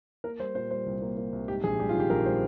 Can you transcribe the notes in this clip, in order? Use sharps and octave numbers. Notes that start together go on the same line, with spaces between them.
A#3 A#4
G3 C5
A#2 C5
G3 C5
C2
A#3
A#3
C2
G#2 G4
A#1 G#4
G3 G4
F4
D#3 G4
A#1 A#4
G3 C5